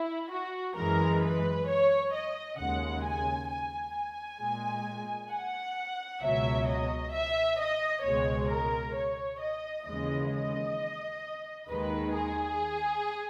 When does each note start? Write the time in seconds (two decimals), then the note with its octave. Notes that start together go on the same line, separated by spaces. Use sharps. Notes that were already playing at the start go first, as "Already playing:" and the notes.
Already playing: E4
0.31 F#4
0.76 F#2 E3 G#3 A#4
1.22 B4
1.68 C#5
2.13 D#5
2.58 D#2 C#3 G#3 F#5
3.04 G#5
3.49 G#5
3.95 G#5
4.40 A#2 G#3
5.31 F#5
6.22 C#2 B2 F#3 E5
6.67 D#5
7.13 E5
7.59 D#5
8.04 C#2 B2 G#3 C#5
8.50 A#4
8.95 C#5
9.40 D#5
9.86 D#2 C#3 E3 G#3 D#5
10.32 D#5
11.69 D#2 D#3 G#3 B4
12.13 G#4